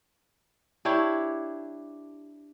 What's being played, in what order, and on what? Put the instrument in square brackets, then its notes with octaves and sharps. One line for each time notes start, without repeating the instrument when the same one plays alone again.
[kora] D4 E4 G4 C#5